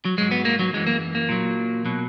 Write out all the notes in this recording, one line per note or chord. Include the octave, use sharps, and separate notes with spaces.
F#3
G#2 F#3 G#3
B3
A#3
F#3
F#2 E3 G#3
A#3
A#3
A#2 F#3
B2 F#3